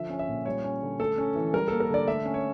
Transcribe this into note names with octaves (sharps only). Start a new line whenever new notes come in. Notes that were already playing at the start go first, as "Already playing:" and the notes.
Already playing: D3 F3 E5
C#4
E5
A#2
G3 C#5
C#4
D3
A3 A4
C#4
E3
G3 A#4
A#3 A4
A#4
D3 D5
A3 E5
C#4
C#5